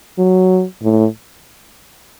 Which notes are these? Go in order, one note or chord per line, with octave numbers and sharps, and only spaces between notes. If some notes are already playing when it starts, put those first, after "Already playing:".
F#3
A2